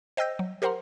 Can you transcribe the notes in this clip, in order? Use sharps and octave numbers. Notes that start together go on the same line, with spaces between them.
C5 D#5 G5 E6 G6 A#6
F#3
G4 A#4 C5 F#5 A#5 C6